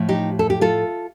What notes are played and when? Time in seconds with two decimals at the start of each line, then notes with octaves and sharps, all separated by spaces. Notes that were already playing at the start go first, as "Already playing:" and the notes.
Already playing: A2 F3
0.09 D#4 G4
0.39 A4
0.50 G4
0.61 F4 A4